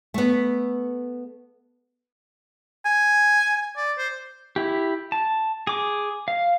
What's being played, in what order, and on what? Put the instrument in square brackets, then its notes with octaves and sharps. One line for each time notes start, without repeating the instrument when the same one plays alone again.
[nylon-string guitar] A3 B3
[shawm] G#5
D5
C5
[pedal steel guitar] E4 G4
A5
G#4 D6
F5